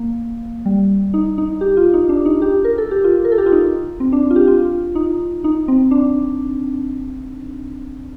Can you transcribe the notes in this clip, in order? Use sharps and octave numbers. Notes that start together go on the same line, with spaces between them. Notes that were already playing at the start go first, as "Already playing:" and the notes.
Already playing: A#3
G3
D#4
D#4
G4
F4
D#4
D4
D#4
G4
A#4
A4
G4
F4
A#4
A4
G4
F4
D#4
C4
D4
F4
G4
F4
D#4
D#4
C4
D4